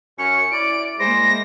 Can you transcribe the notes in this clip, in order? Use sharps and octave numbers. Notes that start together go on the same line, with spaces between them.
F#2 C#4 C#7
E4 D5 D7
G#3 A#3 E4 G#4 C5 A#6